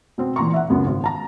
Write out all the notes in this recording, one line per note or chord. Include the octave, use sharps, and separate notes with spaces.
B2 C4
A#2 E3 A#5 C6 C#6
E5 F#5
C#2 F#2 B3
G#1
A5 A#5